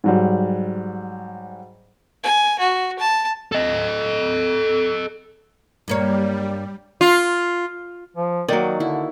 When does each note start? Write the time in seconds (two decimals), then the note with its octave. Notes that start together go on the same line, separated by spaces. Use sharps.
0.04 G#2 F#3 G3
2.23 G#5
2.59 F#4
2.99 A5
3.52 A4 D#5
5.88 G2 G3 A#3 C#5
7.01 F4
8.17 F3
8.48 D#3 F#3 A#3 F#4 D5
8.80 D3 E4